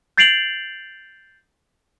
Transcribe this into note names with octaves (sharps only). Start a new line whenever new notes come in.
G6 A6 C7 D7 F7 F#7